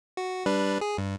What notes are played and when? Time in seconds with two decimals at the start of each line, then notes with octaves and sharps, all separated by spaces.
0.17 F#4
0.46 G3 D4 B4
0.81 G#4
0.98 G2